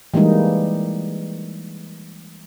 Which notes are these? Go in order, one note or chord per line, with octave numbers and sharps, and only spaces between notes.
E3 G3 G#3 A#3 D#4